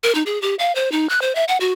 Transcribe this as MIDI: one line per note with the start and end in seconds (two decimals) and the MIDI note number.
0.04 0.14 70
0.15 0.23 63
0.26 0.40 68
0.42 0.55 67
0.59 0.74 77
0.75 0.91 72
0.92 1.08 63
1.09 1.22 90
1.22 1.35 72
1.35 1.44 76
1.48 1.57 78
1.60 1.72 66